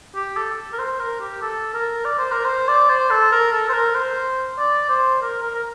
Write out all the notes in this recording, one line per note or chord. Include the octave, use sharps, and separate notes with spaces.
G4
A4
A#4
C5
A#4
G4
A4
A#4
D5
C5
A#4
C5
D5
C5
A4
A#4
A4
C5
A#4
C5
D5
C5
A#4
A#4
A#4